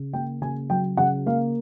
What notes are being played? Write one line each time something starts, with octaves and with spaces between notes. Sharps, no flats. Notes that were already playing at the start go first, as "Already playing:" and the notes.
Already playing: C#3
A#3 G5
C#3 G#5
F#3 G5
C#3 F#5
A#3 F5